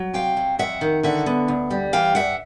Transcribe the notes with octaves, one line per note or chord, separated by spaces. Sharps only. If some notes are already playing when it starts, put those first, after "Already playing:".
Already playing: F#3
C3 F5 G5
F#3
F2 E5 F#5
D#3
D3 E5 F#5
B3
D2
G3
E3 F5 G5
G2 E5 F#5